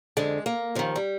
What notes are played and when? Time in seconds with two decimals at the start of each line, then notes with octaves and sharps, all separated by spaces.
0.17 F2 D3 G#3
0.46 A#3
0.75 D#2 D#3 F3
0.96 G3